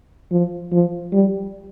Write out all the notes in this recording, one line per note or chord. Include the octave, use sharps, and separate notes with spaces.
F3
F3
G3